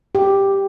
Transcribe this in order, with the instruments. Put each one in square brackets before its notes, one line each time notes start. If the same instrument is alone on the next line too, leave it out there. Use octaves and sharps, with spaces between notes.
[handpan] G4